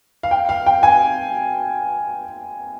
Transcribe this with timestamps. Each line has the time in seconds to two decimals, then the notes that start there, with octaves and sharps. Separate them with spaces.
0.23 F5
0.31 G5
0.49 F5
0.66 G5
0.83 G#5